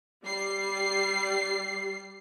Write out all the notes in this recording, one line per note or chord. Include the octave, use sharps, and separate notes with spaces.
G3 C7